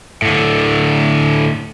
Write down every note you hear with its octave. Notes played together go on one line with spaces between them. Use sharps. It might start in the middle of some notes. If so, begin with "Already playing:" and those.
A2 D3